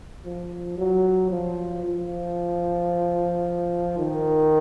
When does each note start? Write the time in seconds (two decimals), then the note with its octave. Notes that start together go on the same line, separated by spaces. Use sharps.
0.25 F3
0.78 F#3
1.31 F3
1.85 F3
3.98 D#3